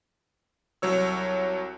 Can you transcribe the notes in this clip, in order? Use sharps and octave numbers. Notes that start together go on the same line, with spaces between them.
C2 F#3 C#5 E6